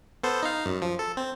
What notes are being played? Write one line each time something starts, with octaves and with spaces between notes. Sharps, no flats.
B3 A4 C5
D#4 F5
F#2
F3
A4
C4